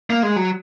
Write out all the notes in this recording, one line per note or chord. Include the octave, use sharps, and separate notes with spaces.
A#3
G#3
F#3